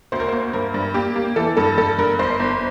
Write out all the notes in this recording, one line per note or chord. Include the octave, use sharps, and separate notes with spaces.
D2 C5
A#4
A#3 C5
G2 A#4
G2
A#3 G4
A#3
E3 A4
G2 A4
G2 A4
G2 A#4
G1 C5
G1